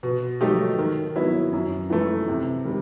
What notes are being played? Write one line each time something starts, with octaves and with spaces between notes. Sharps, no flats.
B2
F#3 A3 D#4 G4
D#3
F#3 B3 E4
F#2
E3 A3
C3
D#3 G3